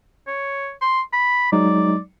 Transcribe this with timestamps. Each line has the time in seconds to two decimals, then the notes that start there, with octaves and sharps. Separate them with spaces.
0.27 C#5
0.81 C6
1.13 B5
1.52 F#3 G#3 D#4 D5